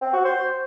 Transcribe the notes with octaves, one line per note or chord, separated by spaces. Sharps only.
C4
F#4
C5